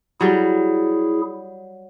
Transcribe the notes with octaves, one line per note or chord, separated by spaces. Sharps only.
F#3 G3 E4 G#4